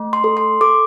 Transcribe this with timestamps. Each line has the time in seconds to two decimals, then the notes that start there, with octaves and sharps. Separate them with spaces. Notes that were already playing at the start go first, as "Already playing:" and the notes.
Already playing: A3
0.13 C6
0.24 A4
0.37 C6
0.61 A4 D6